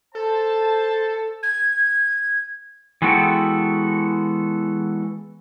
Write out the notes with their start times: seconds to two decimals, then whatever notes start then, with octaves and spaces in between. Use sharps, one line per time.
0.15 A4 C5 A5
1.42 G#6
3.02 E3 G#3 B3 F#4 A4 G5